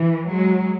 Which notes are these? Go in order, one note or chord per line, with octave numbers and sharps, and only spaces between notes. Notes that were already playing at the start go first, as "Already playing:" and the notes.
Already playing: E3
F#3 G#3